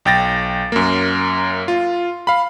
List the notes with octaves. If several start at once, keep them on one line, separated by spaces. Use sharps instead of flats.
B1 G5 A6 A#6
F#2 A#3
F4
F5 B5